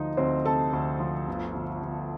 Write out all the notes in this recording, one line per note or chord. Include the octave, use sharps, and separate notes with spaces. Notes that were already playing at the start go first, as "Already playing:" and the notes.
Already playing: D2 F3 D#4 D#5
D2 C4 C5
C3 A4 A5
D2
F3
G1
G1
G1